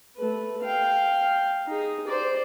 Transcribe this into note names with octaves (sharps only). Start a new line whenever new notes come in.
A3 B4
F5 G5
D#4 G#4
C5 D5